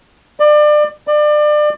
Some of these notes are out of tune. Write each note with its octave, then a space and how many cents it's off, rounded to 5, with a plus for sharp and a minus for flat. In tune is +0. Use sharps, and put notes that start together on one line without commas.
D5 +30
D5 +30